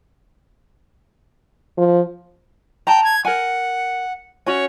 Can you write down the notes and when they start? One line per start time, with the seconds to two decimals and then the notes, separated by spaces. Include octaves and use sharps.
1.77 F3
2.87 G5 A5 A#5
3.04 G#6
3.25 A#4 F#5 G#5
4.46 C#4 F#4 C#5 G#5